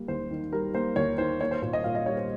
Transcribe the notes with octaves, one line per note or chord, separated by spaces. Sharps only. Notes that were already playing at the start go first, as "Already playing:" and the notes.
Already playing: G3 A#3
D#2 C5
D#3
G3 A#4
A#3 C5
D#2 C#5
D#3 C5
A#3 C#5
C5
A#2 C5
D#5
A#2 F5
D#5
G3 C#5
C5